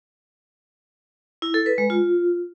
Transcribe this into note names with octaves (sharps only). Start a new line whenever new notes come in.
E4
A4
B4
G#3
F4